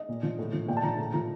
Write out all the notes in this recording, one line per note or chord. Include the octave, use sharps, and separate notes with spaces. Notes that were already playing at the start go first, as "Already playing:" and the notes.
Already playing: D#5
A#2
F3
A2
F3
A#2 G5
A5
F3 A#5
A2 A#5
F3 A#5